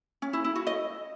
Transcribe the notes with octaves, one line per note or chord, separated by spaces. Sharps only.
C#4
E4
E4
F#4
D#5